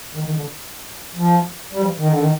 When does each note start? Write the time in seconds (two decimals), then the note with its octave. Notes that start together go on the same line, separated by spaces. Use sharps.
0.15 D#3
0.26 D#3
0.36 D3
1.15 F3
1.72 G3
1.81 F3
1.98 D#3
2.08 D3
2.18 D#3